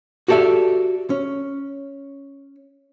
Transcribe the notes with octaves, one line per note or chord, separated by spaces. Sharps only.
F#4 G4 A4 D5 E5
C#4